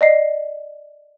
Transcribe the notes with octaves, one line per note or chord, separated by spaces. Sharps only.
D5 D#5 C7